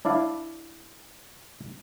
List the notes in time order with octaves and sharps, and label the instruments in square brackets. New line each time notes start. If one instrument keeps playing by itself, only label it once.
[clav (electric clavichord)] D4 E4 D5 F5